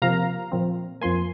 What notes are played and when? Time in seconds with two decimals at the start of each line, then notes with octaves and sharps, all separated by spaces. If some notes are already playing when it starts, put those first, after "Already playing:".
0.02 C3 F3 A#3 F5 A#5
0.52 A#2 F3 C4
1.01 F2 F3 A#3 G#5 C6